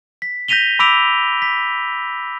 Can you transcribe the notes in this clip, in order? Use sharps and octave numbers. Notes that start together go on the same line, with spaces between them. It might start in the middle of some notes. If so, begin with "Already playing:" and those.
B6
G6 A#6 B6 D#7 F7 G7
B5 D6 E6 B6 D7 F7
B6